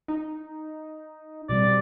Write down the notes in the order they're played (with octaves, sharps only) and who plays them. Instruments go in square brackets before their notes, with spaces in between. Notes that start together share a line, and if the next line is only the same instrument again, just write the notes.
[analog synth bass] D#4
[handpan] B2 G3 C4 [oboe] D5